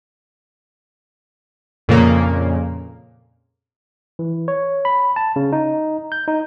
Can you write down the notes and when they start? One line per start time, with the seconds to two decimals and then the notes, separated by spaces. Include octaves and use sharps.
1.88 F2 A#2 C#3 A#3
4.19 E3
4.48 C#5
4.85 B5
5.16 A5
5.36 C#3
5.52 D#4
6.12 G6
6.28 D#4